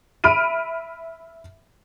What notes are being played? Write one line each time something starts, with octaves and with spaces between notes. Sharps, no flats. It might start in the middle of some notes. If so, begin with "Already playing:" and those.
E5 B5 F6 D7 D#7